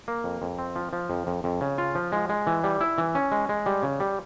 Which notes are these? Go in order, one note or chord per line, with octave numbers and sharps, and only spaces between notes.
A#3
F2
F2
C4
F3
F3
F2
F2
F2
C#3
F4
F3
G#3
G#3
E3
G3
E4
E3
C#4
G#3
G#3
G3
C#3
G3